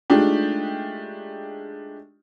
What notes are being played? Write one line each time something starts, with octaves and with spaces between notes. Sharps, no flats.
G#3 A3 D4 D#4 F4 G4